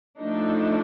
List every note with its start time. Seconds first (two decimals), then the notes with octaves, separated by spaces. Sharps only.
0.19 F3 A3 D4 D#4